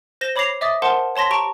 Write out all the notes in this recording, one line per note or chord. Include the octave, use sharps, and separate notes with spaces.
C5 A#6 E7 G7
C#5 B5 D6 A#6 C7 F7
D#5 E5 D6 D#6 A6
A#4 C5 F#5 A5 C6
C#5 A5 C6 A#6 B6
G4 A5 A#5 C#6 D7